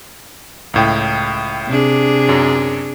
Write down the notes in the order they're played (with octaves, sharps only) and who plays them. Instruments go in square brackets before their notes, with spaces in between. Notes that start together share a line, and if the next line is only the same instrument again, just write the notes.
[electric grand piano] C#2 A2 G5
[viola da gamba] C3 D4 G#4
[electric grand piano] F#2 F#3